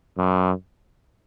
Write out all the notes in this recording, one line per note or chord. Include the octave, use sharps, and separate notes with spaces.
F#2